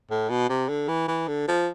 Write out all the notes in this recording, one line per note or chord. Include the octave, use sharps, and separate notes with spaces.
A2
B2
C3
D3
E3
E3
D3
F3